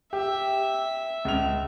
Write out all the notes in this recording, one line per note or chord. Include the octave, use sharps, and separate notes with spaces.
G4 E5
C#2 F7